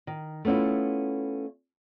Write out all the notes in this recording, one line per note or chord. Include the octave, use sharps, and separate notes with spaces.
D#3
A3 B3 C#4 E4 F4